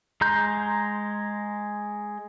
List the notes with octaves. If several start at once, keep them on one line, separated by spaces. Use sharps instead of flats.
G#3 A#5 C6 G6